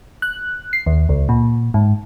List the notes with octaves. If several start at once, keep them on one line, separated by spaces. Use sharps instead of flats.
F#6
C7
D#2
C#2
A#2
G#2